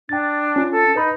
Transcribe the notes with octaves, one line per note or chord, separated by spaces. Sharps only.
D4 G5 A6
C#4 F4
A4
D#4 B4 B5